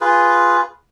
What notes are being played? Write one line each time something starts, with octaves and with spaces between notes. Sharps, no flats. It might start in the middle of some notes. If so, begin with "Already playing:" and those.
F4 G#4 B4